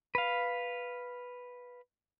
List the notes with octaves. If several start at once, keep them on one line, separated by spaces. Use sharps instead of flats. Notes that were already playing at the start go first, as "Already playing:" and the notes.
B4 F5